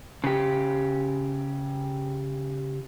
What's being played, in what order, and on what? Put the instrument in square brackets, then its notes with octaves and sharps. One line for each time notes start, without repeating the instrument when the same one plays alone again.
[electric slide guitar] C#3 G4